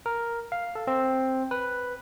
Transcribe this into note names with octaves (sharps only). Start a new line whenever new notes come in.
A#4
F5
A4
C4
B4